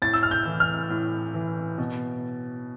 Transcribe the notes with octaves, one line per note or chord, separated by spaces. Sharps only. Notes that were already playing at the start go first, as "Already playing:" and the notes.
A2 A6
E6
F6
G6
E3
F6
A2
E3
B2